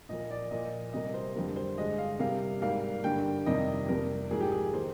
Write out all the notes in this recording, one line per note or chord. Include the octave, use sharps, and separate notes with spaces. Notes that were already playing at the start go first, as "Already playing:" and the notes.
A#2 F3 A#3 D#5
D5
A#2 F3 A#3 D#5
C3 G3 A#3 D#5
C5
F2 D3 G3 A#3
C5
G2 D3 G#3 D#5
F5
C3 G3 A#3 F5
G#2 G3 A#3 F5
G2 D3 G3 A#3 G5
F2 C3 D#3 G3 A#3 D#5
F2 C3 G3 A#4
G#2 F3 A#3 G#4
G4
G#4
D#3 A#3 C5